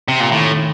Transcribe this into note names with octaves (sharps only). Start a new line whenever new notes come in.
C3
A#2
A2 D#3